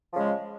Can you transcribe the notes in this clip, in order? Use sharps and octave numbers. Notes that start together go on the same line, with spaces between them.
C#3 F3 G#3